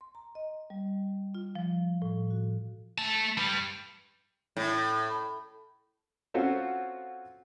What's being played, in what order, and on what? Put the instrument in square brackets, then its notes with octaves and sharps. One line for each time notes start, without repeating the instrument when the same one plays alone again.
[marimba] C6
A#5
D#5
G3
F4
F3
A2
F#4
[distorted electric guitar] A3 A5
G3 B4
[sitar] A2
[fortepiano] C4 C#4 F4 F#4 A4 C5